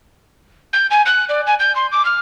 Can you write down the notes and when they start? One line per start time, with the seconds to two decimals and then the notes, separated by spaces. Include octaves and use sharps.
0.73 G6
0.91 G#5
1.06 F#6
1.29 D5
1.47 G#5
1.59 G6
1.76 C6
1.92 D6
2.05 F6